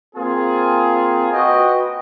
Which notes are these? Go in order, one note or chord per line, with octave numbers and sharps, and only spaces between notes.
A#3 C4 F4 G#4
F#4 B4 D#5 G5